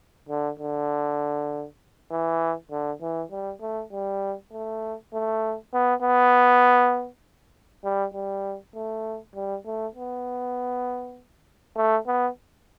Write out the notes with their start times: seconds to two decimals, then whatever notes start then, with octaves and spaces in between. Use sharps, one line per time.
0.29 D3
0.59 D3
2.11 E3
2.71 D3
3.01 E3
3.31 G3
3.61 A3
3.92 G3
4.52 A3
5.13 A3
5.73 B3
6.02 B3
7.84 G3
8.14 G3
8.75 A3
9.35 G3
9.66 A3
9.95 B3
11.76 A3
12.07 B3